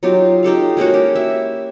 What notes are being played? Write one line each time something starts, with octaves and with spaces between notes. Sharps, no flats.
F#3 D#4 F4 G4
D#4 G4 A4 F5
G#3 A#3 C#4 F#4
G4
E4 E5